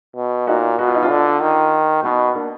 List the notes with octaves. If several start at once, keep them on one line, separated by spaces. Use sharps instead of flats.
B2
A#2 D#4 F#4
B2 F#4
F4
D#4
D4 F4
D3
D#3
B2 B3 D#4
A#3 D4